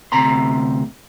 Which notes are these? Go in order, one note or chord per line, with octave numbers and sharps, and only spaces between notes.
D2 C3 A#5 C6